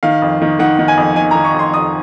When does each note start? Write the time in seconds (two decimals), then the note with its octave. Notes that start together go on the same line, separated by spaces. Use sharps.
0.03 D#3 F5
0.22 F2
0.42 D#3
0.59 D#3 F#5
0.79 D#3
0.88 G#5
0.97 F2
1.16 D#3 G#5
1.31 D#3 A#5
1.45 C#6
1.54 F2
1.59 C6
1.74 F2 D#6